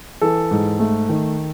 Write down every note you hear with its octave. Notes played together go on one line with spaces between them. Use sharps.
E3 A4
G#2
A3
D#3